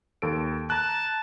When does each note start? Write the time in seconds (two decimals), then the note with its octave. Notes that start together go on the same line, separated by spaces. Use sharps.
0.22 D#2 A4 D7
0.70 A5 A#5 F#6